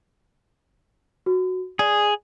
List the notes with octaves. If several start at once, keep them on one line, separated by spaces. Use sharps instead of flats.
F#4
G#4 D5